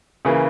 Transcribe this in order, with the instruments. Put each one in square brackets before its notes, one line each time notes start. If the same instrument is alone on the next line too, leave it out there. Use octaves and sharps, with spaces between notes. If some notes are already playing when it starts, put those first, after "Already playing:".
[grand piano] C#3 E3 A#3